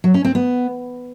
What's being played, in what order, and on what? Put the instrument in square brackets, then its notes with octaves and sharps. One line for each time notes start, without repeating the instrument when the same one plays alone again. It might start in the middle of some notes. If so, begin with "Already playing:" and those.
[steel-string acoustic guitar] F#3
C#4
C4
B3